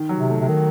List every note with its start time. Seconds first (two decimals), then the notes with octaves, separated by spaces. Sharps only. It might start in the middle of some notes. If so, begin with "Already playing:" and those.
Already playing: D#3
0.09 F#3
0.19 C3
0.30 A3
0.41 C3
0.49 D#3